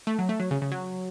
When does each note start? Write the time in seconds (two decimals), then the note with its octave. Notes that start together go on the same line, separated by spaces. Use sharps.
0.07 A3
0.19 F#3
0.29 A3
0.40 F#3
0.51 C#3
0.62 C#3
0.72 F#3